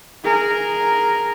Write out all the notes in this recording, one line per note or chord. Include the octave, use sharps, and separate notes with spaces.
G#4 A#4